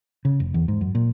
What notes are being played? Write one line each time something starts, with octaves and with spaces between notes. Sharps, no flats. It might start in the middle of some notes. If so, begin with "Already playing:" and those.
C#3
F1
E2
G#2
F#2
A#2